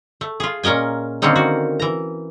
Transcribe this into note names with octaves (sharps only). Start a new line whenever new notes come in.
A3
F4 G#4
A#2 C#4 A#4 D#5 G#5
D3 D#3 A#3 C4 C#4 D#4
F#4
E3 A#5